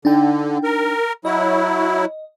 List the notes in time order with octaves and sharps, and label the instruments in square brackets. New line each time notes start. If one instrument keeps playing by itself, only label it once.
[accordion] D3 [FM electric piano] D4 D#4 G5
[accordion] A#4
[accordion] F#3 E4 [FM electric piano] D#5